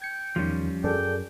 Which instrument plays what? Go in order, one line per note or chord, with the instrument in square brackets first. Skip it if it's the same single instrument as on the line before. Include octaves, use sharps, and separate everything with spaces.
[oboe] G5 [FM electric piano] G#6 C#7
[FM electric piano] E2 D#3 [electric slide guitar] F3 G3 C#4
[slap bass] F#2 [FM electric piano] G#4 A4 D5 [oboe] G5